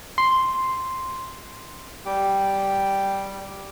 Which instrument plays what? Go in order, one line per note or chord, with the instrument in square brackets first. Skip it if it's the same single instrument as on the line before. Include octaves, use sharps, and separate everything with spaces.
[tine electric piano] C6
[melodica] G3 G4 G5